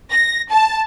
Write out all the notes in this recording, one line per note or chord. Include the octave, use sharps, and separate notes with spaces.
A#6
A5